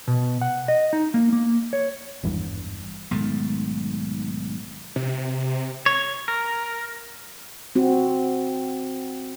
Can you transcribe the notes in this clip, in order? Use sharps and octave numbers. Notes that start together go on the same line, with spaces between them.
B2
F#5
D#5
D#4
A#3
A#3
C#5
G#1 E2 G2
B1 G#2 D#3 A3
C3
C#5
A#4
C4 F#4